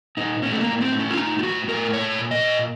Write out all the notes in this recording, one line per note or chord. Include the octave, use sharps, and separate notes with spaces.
A#2 D#4
A2 C#4
A3
A#3
A2
C4
A2
C#4
F4
A2 D#4
F4
A2 F#4
A2 A#4
A#2 C#5
A#2
D#5
A#2